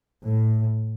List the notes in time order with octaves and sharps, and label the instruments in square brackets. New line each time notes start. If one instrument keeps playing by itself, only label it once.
[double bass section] A2